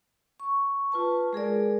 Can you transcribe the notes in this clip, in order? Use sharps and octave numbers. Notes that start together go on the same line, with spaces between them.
C#6
F4 B4 A5
G#3 G#4 A#4 D5